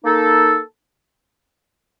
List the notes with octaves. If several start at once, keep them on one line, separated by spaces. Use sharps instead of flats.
A#3 D#4 A4